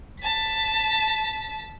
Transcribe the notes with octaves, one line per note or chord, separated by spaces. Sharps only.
A5 B6